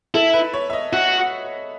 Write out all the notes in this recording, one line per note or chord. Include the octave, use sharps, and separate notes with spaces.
E4 A4
B4
C#5
E5
D#5
F#4 E5